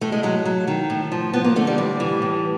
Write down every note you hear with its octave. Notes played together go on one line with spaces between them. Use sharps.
A2 A3
G#3
F#3 G#3
F#3
D#3
A2
F3
F3 B3
A#3
D3 A3
G3
A2 G3
E3
A2